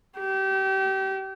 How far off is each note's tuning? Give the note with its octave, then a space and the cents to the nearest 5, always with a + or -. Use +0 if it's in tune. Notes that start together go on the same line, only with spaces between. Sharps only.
G4 -30